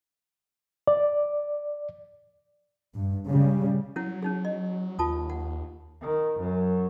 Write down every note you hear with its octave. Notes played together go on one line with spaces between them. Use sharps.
D5
G2
C#3 G3
F#3 C#4 E4 F#5
C#4 D#4 G#4
D#5
D#2 F4 A5 D#6
F#5
D#3
F#2